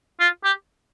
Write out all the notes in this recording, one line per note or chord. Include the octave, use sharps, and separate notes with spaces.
F4
G4